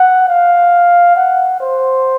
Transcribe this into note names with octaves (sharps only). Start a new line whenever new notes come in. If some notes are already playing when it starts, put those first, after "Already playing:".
Already playing: F#5
F5
F#5
C5